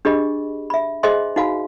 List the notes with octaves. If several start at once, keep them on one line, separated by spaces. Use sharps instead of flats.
D4 G4 G#4 D#5 B5
E5 B5
G#4 C5 D#5 E5 G#5 C6
D#4 F#4 F5 G#5 B5